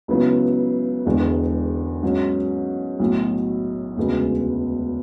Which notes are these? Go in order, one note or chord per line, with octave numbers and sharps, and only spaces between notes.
C#2 C#3 F#3 B3 E4
E1 E2 D3 G#3
G#2 F#3 C#4
B1 A2 F#3
E1 D2 C#3 G#3 B3